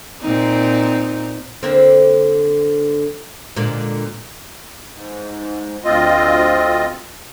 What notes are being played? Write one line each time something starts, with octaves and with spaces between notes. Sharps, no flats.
A#2 C4 D#4
D3 A#3 C4
A#2 D3 G#3
G#2
D2 C4 F4 D#5